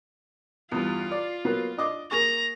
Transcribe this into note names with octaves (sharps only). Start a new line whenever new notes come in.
E2 G2 F4
D5
F#3 A#3 B3
D4 D#5 D6
A#3 G#4 A#5 C#6